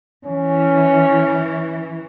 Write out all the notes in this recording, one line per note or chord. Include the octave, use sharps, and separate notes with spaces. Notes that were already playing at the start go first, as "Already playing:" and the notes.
E3 C#4